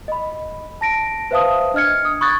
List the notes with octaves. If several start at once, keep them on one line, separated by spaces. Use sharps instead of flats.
D#5 B5
A5 A#6 D7
B4 C5 E5 F5 A5 D#6
D4 D#5 F6 G#6 C#7
D#6
B5 C#6 D#6 F#6 G#6 A6